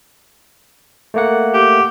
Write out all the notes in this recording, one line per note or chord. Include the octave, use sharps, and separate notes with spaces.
A3 A#3 F#5
G4